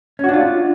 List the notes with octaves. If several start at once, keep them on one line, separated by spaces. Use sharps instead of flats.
C#4 D4 F4 F#4